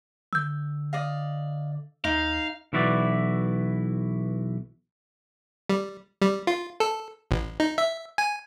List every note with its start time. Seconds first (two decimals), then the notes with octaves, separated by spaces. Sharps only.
0.33 D3 E6 G6
0.93 D5 D#5 F5
2.04 D#2 D#4 F5
2.73 B1 E3 E4 F#4 D5
5.70 G3
6.22 G3
6.47 F4
6.80 A4
7.31 A1
7.60 D#4
7.78 E5
8.18 G#5